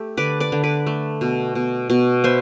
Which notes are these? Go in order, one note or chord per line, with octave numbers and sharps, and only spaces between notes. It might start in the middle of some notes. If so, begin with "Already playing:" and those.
Already playing: A3 G4
D3 B4 D5
B4 D5
D3
B4 D5
A3
B2
B2
B2
B3 C5 E5